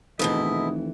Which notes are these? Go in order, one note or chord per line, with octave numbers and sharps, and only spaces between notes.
F1 G#2 B2 D#3 E3 A3 E4 D#5